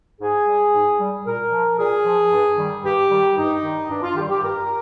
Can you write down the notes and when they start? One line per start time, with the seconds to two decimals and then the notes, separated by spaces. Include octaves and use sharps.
0.20 G#2 G#4
0.46 G3
0.73 G#2
0.99 G3
1.26 A#2 A#4
1.52 F3
1.79 A#2 G#4
2.05 F3
2.32 G2
2.58 D#3 G3
2.84 G2 G4
3.11 D#3 G3
3.37 G2 D#4
3.63 D#3 G3
3.89 G2 D4
4.03 F4
4.16 D#3 G3 G4
4.29 G4
4.42 G2 A#4